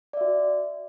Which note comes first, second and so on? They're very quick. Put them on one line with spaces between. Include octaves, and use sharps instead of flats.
D5 E5 F#4